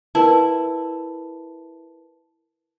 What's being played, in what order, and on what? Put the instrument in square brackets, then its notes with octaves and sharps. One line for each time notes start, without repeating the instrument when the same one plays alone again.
[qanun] E4 [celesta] A#4 B4 A5